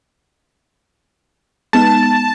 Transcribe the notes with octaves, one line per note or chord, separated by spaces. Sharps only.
G#3 B3 D#4 A5